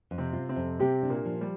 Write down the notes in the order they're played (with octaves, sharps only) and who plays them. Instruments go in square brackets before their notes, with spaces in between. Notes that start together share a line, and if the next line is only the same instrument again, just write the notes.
[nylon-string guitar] F2
[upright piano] C3 C4
[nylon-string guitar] F4
[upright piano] C3 C4
[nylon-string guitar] F2
[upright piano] C3 C4 [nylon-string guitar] G4
[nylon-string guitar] D4
[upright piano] A#2 A#3
[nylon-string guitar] F3
[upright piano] G3